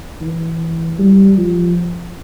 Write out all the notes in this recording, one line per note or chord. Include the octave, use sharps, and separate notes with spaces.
E3
G3
F3